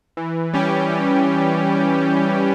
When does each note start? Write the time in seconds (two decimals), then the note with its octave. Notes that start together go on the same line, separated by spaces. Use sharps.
0.17 E3
0.53 G3 C#4 G4
0.89 E3